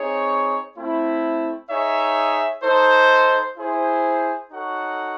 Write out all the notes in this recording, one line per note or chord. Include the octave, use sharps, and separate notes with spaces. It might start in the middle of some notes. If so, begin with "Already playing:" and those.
Already playing: C4 D#4 G#4 C#5
A3 C4 E4
D#4 G#4 C#5 E5
D#4 A4 C5
E4 G#4 C5
D#4 F#4 A4 C#5 F#5